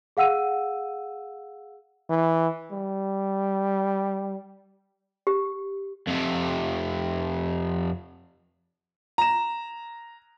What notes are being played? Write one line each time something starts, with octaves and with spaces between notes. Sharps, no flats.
G#4 F5 F#5 E6 D#7
E3
G3
G4
F2 C3
A#5 E7